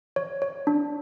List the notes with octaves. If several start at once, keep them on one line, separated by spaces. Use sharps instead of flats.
C#5
C#5
D4